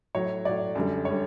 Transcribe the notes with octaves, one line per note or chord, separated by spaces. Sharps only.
A2 F#3 C#5
A2 F#3 D5
F#2 D3 G3
C#5
D3 G3